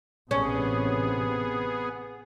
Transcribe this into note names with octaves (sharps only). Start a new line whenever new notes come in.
A1 C3 B3 C#4 G#4